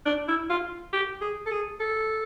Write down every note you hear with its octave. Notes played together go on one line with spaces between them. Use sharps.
D4
E4
F4
G4
G#4
A4
G#4
A4